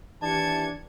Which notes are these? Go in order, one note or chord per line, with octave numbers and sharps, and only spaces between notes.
D#2 E3 D4 G4 A5 G#6 C#7